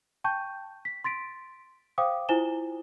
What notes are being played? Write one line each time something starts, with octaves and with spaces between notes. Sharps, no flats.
G5 A5 C#6 G6
B6
C6 A6 B6 D7
C5 F5 G5 D6 D#6
E4 F4 C5 G#5 E7 G7